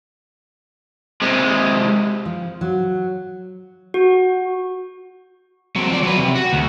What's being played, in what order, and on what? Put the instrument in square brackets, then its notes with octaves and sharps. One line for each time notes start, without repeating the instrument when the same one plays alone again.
[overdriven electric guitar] C3 G#3
[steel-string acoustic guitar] F3
F#3
[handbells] F#4
[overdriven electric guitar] F#3 C4
F3 D5
F#3 B4
C3
F#4
D2